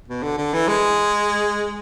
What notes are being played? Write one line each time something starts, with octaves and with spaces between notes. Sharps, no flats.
B2
D3
D3
E3
G#3